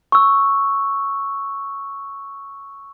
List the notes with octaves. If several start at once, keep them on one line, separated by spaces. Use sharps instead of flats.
C#6 E6